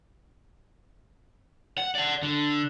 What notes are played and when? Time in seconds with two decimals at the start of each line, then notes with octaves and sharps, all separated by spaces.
1.78 F#5
1.95 D5 F#5
2.23 D3